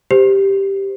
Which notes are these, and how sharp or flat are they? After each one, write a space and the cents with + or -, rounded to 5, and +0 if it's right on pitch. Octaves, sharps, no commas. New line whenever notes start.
G4 +0 C5 -15